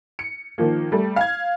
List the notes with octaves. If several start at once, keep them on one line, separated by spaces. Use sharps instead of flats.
C#7
D#3 F3 A#3
G3 A3
F5 G#6